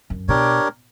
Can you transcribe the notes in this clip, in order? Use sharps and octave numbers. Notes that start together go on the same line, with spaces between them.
F#2
B2 D4 G4 A#4 C#5